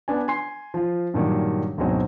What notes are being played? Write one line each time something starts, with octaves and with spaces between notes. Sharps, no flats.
B3 D4 B4 G#5
G#5 C6 C7
F3 F4
G2 A#2 D#3 F#3 G3
D2 G#2 B2 F#3 C4 D#5